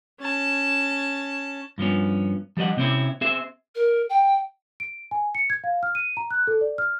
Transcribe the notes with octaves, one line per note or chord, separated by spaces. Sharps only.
C#4 A5
G2 F3 B3 C#4
F3 G3 A#4 D#5 F#5
C3 C4 C#4 E4
C4 G#4 C5 E5
A#4
G5
D7
G#5
C#7
G#6
F5
F6
D#7
A#5
F#6
A4
D5
F6